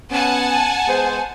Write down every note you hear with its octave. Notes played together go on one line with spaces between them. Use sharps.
B3 C#4 F#5 G#5 A5
G#3 B3 C5